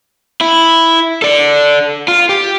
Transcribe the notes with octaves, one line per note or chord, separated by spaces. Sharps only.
E4
A4 D5
F4
G4